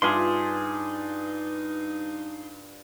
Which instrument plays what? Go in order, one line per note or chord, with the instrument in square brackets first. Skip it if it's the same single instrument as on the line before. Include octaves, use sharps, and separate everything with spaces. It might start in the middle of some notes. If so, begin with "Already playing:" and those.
[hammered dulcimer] G2 F4 A5 [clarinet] D#4 [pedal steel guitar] G#4 C6